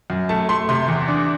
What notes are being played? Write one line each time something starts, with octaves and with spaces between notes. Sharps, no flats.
F#2
A3 A5
A3 C6
C3 C6
E2
D4